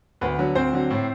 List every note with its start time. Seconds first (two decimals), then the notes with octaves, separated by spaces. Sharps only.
0.21 D2 B3 B4
0.39 D3 F#3
0.55 D2 C4 C5
0.72 D3 F#3
0.90 A2